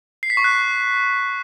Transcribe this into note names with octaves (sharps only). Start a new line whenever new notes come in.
C7
B6
C#6
F#6
C7